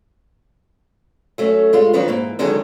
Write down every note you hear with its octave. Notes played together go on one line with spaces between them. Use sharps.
F#3 A3 C#4
G2 G#3 F4
D#3 F3 F#3 D4 B4 C#5
G#2 E3 A#3
E2 D3 D#3 F#3 G#3 G#4